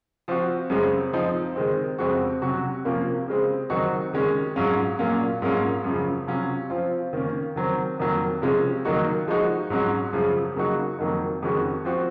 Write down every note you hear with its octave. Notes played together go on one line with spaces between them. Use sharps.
F3 C4 F#4
F#2 C#3 G#3 C4
F3 C4 D#4
D#3 G#3 C4
F2 C#3 G#3 C4 F#4
C3 F#3 C#4 F#4
C3 F3 A#3 C#4 F4
C#3 G#3 C4
D#3 F#3 C4 D#4 F#4
D#3 G#3 C#4
G#2 F#3 C#4 F4
A#2 F#3 A#3 C#4 F4
G#2 F#3 A#3 C#4 F4
F#2 C#3 F3
C3 F#3 C#4 F4
F3 C4 F4
D#3 A#3 C#4
D#3 F#3 C4
F2 D#3 F#3 A#3
C3 F3 G#3 C#4
D#3 F#3 A#3 D#4 F#4
F3 G#3 D#4 F#4
G#2 F#3 C#4 F#4
F#2 C#3 F3
C#3 F#3 A#3 D#4 F#4
F2 D#3 F#3 A#3 D#4
F2 D#3 G#3 C#4 F#4
F3 C4 F#4